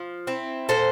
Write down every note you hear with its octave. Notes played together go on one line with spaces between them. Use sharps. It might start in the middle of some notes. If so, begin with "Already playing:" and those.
Already playing: F3
C4 E4
A#2 A4 C5